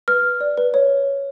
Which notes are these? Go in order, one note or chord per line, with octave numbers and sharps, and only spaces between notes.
B4 F6
B4
D5
B4
C#5